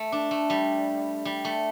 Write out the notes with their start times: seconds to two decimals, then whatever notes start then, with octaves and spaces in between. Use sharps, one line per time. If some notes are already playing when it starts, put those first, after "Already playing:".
Already playing: A3
0.12 D4
0.31 A3
0.50 G3
1.25 G3
1.45 A3